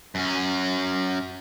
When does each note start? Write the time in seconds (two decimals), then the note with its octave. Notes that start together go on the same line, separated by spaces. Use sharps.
0.15 F#2 C#4